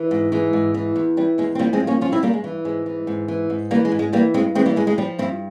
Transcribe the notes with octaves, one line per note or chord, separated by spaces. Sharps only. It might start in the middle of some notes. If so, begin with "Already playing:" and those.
Already playing: E3
G#2
E3 G#3
G#2
E3
E2
E3 G3
E2 G#3
C4
F3 G3 A#3
G#3 C4
G2
A#3 C#4
F3 C#4 F4
C4 E4
G2 G3 A#3
G#3
E3
G#2 G#3
E3
G#2
E3
G#2
E3 G3 A#3
G#3
G#2
G#3
E3 G3 A#3
G2 G#3 C4
E3 G#3 C4
G3 A#3
G2 G#3
G#3
F3 G3
G2 C4 E4